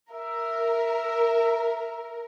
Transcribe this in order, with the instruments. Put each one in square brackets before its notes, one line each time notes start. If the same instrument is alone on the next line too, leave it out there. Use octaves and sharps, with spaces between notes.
[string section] A#4 [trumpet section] E5